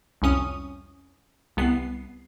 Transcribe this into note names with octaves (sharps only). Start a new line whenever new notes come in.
C2 F2 C#4 D#6
C2 B3 C7